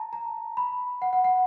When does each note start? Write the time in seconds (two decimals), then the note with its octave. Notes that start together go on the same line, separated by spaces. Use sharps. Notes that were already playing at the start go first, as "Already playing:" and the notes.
Already playing: A5 A#5
0.13 A#5
0.57 B5
1.02 F#5
1.13 F#5
1.24 F#5